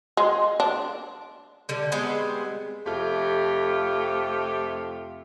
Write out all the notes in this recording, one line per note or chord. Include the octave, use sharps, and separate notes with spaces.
G#3
D4
D3 G3
G3 G#3 B3 C4
F2 C3 A3 F4 G4